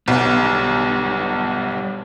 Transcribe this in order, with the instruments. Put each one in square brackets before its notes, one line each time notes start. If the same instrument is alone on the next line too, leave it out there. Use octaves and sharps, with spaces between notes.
[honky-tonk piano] B1 [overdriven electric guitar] G3 B3